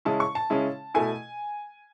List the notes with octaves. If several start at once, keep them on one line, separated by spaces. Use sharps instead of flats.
C#3 G#3 C#4 E4 A5
C#6
A5
C#3 G#3 C#4 E4
B2 A3 E4 G#5